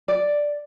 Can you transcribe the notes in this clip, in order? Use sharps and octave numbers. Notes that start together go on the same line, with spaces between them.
D5